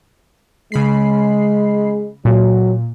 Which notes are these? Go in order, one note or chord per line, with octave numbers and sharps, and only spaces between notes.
C#3 G#3 B5 C7
A#2 F#3